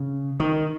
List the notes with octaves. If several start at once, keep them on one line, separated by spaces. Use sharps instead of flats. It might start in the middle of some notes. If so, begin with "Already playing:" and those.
Already playing: C#3
D#3